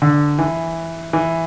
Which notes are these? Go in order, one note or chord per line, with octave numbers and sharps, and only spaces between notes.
D3
E3
E3